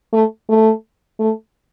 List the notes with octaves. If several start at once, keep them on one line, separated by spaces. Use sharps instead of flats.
A3
A3
A3